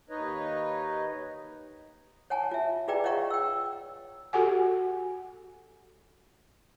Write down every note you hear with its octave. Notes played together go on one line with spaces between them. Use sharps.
D#2 D#4 B4 C#5 D#5
C#5 F#5 G#5 A5
F4 E5
F4 G#4 B4 D5 G5 A#5
C#5 D#5 F5 F#5 A#5 C#6
G5 E6
F#4 G4 A4 F#5 G#5